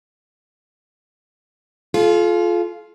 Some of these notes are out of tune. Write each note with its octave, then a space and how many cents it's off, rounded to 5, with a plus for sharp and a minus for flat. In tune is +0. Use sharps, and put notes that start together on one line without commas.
F4 +0 A4 -45